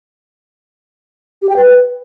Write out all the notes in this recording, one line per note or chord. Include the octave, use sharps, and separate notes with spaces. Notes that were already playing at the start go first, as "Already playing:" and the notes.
G4
G5
B4